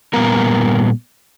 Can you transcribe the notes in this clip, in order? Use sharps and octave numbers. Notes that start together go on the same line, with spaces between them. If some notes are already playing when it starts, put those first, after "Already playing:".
A#2 G3 B3 A#4